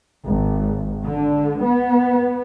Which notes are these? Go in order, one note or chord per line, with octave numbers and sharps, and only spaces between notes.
G#1
D3
B3